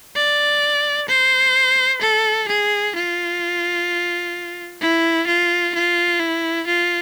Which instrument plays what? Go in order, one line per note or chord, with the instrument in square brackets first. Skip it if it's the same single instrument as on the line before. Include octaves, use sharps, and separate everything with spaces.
[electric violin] D5
C5
A4
G#4
F4
E4
F4
F4
E4
F4